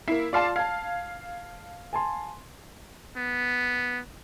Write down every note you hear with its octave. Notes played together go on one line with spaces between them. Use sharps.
A#3 E4 C7
F4 D5 F5 A5 C6 C7
F5 A5 G#6
G#5 A5 C6
B3